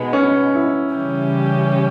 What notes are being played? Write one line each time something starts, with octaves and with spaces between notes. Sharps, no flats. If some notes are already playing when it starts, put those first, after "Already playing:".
Already playing: B2 G#3 B3 D#4
C#4
E4
C#3 E3 G3 C#4 G4